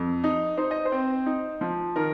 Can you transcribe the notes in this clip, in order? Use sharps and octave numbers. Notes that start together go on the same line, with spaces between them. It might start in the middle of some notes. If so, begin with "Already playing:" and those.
Already playing: F2
D#4
D#4 C5
D#5
C5
C4
D#4
F3
D#3 A#4